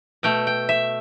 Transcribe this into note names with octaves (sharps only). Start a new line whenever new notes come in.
B2 A3 G5
G5
E5